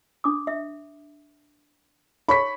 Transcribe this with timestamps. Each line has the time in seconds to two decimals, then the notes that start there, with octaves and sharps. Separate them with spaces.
0.24 D4 D6 D#6
0.47 E5
2.29 D#4 G#4 C#5 B5 C#6 B6